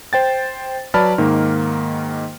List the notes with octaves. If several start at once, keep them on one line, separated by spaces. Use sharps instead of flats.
C5 G5 A6
F#3 B4 D5 A5 B5 F6
G#2 D#3 A#3